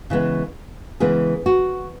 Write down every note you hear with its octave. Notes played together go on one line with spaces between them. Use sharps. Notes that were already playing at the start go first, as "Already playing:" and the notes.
C#3 E3 G#3 B3
C#3 E3 G#3 B3 G#4
F#4